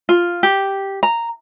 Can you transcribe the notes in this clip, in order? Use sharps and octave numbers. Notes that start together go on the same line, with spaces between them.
F4
G4
A#5